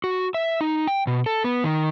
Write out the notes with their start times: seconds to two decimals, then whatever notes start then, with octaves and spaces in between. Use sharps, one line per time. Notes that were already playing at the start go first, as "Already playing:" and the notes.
0.04 F#4
0.34 E5
0.61 D#4
0.87 G5
1.07 B2
1.26 A4
1.44 B3
1.64 D#3